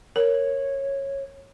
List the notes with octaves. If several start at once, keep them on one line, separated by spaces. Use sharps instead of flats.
A#4 C#5